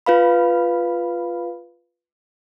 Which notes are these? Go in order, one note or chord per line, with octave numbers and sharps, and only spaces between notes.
F4 B4 F5 B5